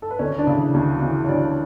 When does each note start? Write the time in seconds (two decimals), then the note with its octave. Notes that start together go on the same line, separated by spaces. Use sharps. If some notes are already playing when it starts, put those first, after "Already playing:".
0.02 A4
0.11 B4
0.19 D2 C#4 C#5
0.38 D4 D5
0.47 C#3 E3
0.74 D2
1.01 C#3 E3
1.24 C#5
1.29 D2 D4 D5